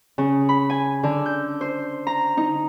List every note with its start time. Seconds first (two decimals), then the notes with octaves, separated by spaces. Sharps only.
0.18 C#3
0.49 B5
0.70 G#5
1.03 D3
1.26 G6
1.61 C5
2.07 A#5
2.37 D#4